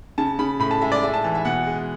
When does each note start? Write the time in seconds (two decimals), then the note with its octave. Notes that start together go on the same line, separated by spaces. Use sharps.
0.18 C#3 A5
0.39 C#3 B5
0.59 A2 B5
0.71 A5
0.81 G#3 E5
0.92 D5
1.02 G#3 E5
1.14 A5
1.24 E3 A5
1.35 E5
1.45 B2 F#5
1.67 G#3